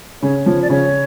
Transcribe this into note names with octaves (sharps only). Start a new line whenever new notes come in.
C#3 C#5
F3
D5
C#3 C#5